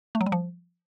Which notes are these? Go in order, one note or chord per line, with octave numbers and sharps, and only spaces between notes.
A3
F#3
G3
F3